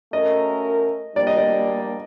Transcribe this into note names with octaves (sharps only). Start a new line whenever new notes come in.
A3 C#4 F#4 A#4 D#5
G3 A#3 D4 D5
D#5
D5